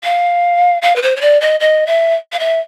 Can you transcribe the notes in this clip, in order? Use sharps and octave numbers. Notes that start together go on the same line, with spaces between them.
F5
F5
B4
C5
C#5
D5
D#5
D#5
E5
F5
E5